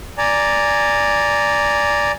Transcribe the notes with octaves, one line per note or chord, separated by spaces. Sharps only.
D5 G#5 A#5